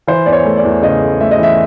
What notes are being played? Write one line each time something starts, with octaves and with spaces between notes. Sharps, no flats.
E3 C5
E2 D5
C#5
A3
D5
E2
C#3 D#5
A3
A3 E5
D#5
E3 E5